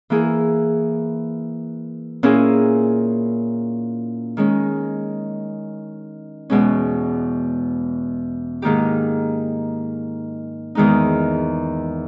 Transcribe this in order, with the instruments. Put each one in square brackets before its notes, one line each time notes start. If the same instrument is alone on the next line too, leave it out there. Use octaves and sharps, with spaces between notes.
[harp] E3 A#3 E4 G#4
A#2 A#3 C#4 E4 G#4
D#3 G#3 C#4
E2 B2 G#3 C#4
G#2 D#3 A#3 D#4 G4
E2 D#3 G#3 D#4